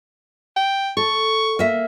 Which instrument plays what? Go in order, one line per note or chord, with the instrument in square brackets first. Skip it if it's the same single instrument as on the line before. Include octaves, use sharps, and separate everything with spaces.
[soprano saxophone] G5
[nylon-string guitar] A4 [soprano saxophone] C#6
[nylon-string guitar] A#3 E5